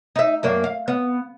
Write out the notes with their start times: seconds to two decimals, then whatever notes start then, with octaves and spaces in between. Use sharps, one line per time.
0.16 D#4 E5
0.43 F#2 A#3 D4
0.64 F5
0.88 B3